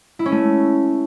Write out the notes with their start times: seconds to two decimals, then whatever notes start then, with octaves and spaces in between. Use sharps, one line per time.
0.19 E4
0.26 C#4
0.32 A3